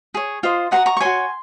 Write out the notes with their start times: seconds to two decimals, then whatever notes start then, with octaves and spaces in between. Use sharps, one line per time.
0.14 G#4 C#5
0.43 F4 C5 D#5
0.71 F#4 C5 D#5 F#5 A#5
0.86 A#5 C#6
0.97 C#6
1.01 F#4 C#5 G#5 C6